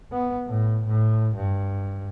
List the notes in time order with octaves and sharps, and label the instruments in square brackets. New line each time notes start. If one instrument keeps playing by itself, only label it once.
[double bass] B3
A2
A2
G2